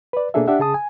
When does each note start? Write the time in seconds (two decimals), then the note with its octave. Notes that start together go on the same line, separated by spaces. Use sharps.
0.13 B4 D5
0.34 B2 A#3 D4 G#4 A4 E5
0.47 D4 G4 E5 F#5
0.59 C#3 G#4 A5 D#6
0.74 G#5